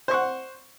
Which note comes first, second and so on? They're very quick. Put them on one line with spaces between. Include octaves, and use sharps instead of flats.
C5 C#6 F#5